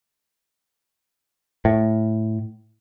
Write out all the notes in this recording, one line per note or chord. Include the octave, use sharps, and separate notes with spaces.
A2